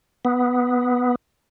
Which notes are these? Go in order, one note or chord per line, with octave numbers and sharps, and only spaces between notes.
B3